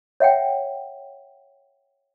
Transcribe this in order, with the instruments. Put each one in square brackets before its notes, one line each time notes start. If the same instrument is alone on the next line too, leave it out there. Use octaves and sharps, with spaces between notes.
[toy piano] C#5 E5 F#5 G5